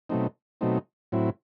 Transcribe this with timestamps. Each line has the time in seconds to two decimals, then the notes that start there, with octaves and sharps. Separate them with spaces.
0.10 B2 F#3 A3 C4 D#4
0.61 B2 F#3 A3 C4 D#4
1.12 A2 F#3 C4 E4